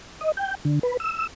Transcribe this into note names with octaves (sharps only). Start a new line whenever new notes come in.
D#5
G5
D3
B4
E6